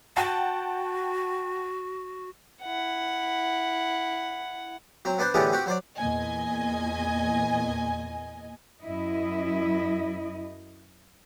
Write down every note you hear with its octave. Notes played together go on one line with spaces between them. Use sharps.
F#4 F#5 G5 A5
E4 F#5
F#3 C4
B3 D4 B4 C5
A2 D3 E3 B3 G4 G#4
C4 F#4 G4
F#3 C5 D5
E2 A#2 D#5 G#5
F#2 E4 D#5